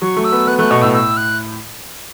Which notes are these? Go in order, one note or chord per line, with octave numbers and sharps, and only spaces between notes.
F#3 C#6
A3
E6
B3
B3 F#6
A3 F#6
B2 C#6
A2 E6
E6
F#6